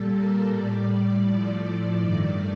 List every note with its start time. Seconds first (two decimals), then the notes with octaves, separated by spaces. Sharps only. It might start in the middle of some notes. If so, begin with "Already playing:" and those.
Already playing: A#2 G3 A4
0.11 A#4
0.50 A2 G3 D5
1.25 A2 F3 A3
2.00 G2 D#3 A3 D5